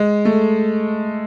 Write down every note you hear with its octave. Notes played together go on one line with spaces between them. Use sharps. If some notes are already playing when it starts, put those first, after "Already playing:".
Already playing: G#3
A3